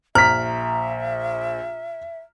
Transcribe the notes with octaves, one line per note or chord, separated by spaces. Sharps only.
A#1 E5 A#5 F6 B6